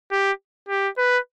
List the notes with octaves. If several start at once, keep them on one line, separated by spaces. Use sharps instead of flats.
G4
G4
B4